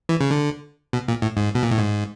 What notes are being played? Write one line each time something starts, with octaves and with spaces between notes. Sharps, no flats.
E3
C#3
D3
B2
A#2
A2
G#2
B2
A#2
A2
G#2